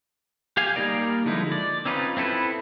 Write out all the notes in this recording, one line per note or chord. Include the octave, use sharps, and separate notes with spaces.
G4 F5 G#5
G3 A#3 D#4 A#4 D5
D3 F3 G#3 D#4 E4
D5
C4 C#4 D#4 F4 B4
C4 E4 A4 B4